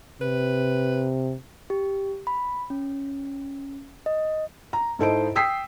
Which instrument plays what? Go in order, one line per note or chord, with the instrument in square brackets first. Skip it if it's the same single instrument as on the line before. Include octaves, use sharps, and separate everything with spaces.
[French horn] C3 [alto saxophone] B4
[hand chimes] G4
B5
C#4
D#5
[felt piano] A#5
G#2 E4 A4 C5 D#5 D7
G5 D#6 E6 B6 C7